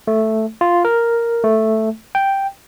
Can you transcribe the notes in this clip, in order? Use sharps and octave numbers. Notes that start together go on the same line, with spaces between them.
A3
F4
A#4
A3
G5